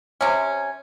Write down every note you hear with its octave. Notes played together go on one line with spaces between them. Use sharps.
C3 C#4